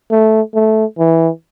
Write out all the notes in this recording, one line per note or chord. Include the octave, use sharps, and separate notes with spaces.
A3
A3
E3